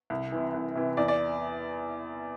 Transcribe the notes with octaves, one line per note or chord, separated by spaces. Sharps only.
C2
C3 E3
C2
C3 E3
E2 D5
D5